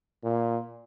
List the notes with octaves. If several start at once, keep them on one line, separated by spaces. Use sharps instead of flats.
A#2